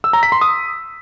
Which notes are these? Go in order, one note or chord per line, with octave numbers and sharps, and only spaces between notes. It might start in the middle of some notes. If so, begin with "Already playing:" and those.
E6
A#5
B6
C6
D#6